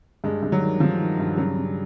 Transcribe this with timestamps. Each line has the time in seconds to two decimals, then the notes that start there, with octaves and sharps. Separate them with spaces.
0.24 G2 G#3
0.43 G2
0.52 F#3
0.61 D#3
0.80 D#3 F3
0.99 D#3
1.19 G2
1.37 C#3 F#3
1.56 C#3